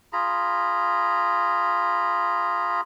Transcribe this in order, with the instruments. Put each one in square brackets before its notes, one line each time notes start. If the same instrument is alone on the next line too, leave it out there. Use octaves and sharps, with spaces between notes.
[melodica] F4 G#4 A#5 B5